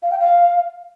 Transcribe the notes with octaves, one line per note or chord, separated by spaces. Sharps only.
F5
G5
F5